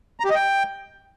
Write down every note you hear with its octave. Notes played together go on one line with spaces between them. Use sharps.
A#5
G4
D#5
G5